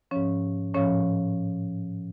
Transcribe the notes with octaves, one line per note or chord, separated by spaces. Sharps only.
G#2 F3 C#4 C#5
A2 F3 C#4 C#5